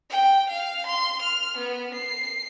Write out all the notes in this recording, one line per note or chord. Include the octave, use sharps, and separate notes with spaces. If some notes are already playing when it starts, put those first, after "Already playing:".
G5
F5
C6
F6
B3
C7